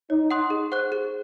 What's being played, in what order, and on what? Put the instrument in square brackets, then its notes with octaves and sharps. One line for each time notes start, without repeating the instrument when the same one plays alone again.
[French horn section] D#4 [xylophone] C#5
[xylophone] F#5 C6 D#6 F#6
G#4
C5 F#5 C#6 F#6
G#4